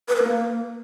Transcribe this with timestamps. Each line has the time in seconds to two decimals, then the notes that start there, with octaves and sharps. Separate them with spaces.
0.08 B4
0.16 A#4
0.23 A#3